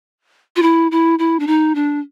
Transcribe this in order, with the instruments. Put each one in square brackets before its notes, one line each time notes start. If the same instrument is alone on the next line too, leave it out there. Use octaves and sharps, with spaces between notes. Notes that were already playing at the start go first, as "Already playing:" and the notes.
[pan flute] F4
E4
E4
E4
D4
D#4
D4